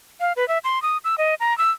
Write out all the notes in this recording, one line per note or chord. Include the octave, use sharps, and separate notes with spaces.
F5
B4
E5
C6
D#6
E6
D#5
A#5
E6